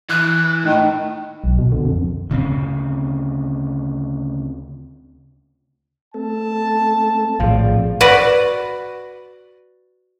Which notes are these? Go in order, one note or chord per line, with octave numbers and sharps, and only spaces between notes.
E3 F#6
A2 D#3
B1
B2
D3
F2
D2 C#3 B3 C4
A3 C4 A4 A5
A#1 A2 D#3 F3 C4 G#4 D5 F5
F#4 B4 D5 F#5